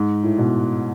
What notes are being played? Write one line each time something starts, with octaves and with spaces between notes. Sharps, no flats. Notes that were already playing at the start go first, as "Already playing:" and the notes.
Already playing: G#2
A2
B2